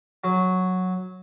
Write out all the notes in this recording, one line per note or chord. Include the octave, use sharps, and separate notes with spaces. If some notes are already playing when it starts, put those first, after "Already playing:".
F#3